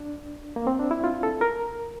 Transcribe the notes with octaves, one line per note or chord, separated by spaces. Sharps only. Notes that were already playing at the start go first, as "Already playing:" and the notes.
Already playing: D4
A#3
C4
D4
E4
F4
A4
A#4